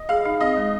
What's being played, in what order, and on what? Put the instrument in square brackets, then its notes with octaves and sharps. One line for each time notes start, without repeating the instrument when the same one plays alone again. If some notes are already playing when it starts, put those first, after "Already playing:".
Already playing: [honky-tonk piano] D#5
[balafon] G#4 [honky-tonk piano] F5
[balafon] D#4
[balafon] C4 [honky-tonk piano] D#5
[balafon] G#3